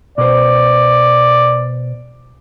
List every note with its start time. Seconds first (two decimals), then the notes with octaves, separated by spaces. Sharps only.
0.18 B2 C5 D5